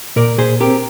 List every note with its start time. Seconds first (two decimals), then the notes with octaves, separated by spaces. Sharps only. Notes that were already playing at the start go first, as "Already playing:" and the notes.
0.16 A#2 A#4 D5
0.38 A#2 G#4 C5
0.60 C4 G4 A#4